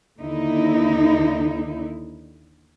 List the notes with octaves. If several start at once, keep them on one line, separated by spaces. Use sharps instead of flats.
D#2 D3 D#4 E4